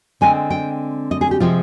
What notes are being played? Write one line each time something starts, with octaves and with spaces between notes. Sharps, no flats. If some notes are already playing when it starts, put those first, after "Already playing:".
D3 G#3 C4 G#5
G5
D#5
G#4
G4
C3 F3 G#3 C4 F4